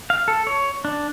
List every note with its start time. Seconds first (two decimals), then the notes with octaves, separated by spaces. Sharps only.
0.10 F5
0.28 A4
0.47 C#5
0.85 D4